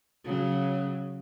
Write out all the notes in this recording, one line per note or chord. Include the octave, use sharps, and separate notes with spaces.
C#3 F#3